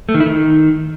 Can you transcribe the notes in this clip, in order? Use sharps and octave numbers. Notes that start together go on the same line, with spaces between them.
A3
D#3
E4
D#3